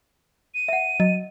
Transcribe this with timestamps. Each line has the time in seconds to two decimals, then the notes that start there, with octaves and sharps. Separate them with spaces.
0.54 D#7
0.68 E5 F#5
1.00 F#3 D#5